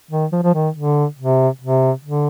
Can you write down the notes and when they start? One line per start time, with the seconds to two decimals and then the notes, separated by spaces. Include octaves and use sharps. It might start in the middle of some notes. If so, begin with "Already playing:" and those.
0.11 D#3
0.32 F3
0.43 F3
0.54 D#3
0.75 D3
1.19 C3
1.61 C3
2.05 D3